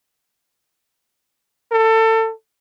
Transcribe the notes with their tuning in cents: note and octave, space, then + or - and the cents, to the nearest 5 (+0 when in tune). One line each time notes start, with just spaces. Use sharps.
A4 +25